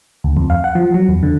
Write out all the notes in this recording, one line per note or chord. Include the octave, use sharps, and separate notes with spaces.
D2
F2
F5
F#5
F3
F#3
E2
D3